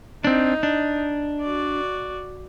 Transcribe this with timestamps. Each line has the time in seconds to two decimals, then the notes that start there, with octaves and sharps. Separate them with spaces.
0.24 C4 D4 D#4
0.63 D4
1.41 F#4 D5